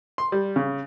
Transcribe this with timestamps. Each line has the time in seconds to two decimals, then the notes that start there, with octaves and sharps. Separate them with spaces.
0.18 C6
0.32 G3
0.56 C#3